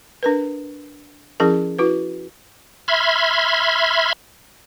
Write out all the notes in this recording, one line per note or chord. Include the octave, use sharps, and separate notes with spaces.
D4 A#4 B4
F3 C#4 E4 G#4 A#4
E4 F#4 B4
E5 B5 C6 F6 G#6